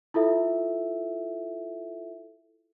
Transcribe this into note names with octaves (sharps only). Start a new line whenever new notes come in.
E4 F4 A4 E5